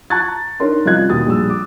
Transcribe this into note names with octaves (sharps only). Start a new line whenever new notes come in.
A5 A#5 C#6 F#6 G#6 A6
D4 D#4 A#4 C#5 C6
C2 C#4 F4 D#5 F#6 G#6
D#2 B2 D#6 A6
A#1 G3 E6
D6